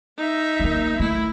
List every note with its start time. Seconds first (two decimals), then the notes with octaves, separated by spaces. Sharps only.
0.18 D#4 E5
0.60 A3 A#3
1.00 A3 E4